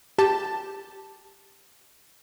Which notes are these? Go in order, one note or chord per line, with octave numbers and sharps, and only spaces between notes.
G4 A5